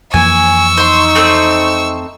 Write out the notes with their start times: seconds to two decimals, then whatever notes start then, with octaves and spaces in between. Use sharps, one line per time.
0.14 F2 E3 A#3 G#5 C#6 E6
0.77 D#4 C5 C6
1.15 A3 C4 C5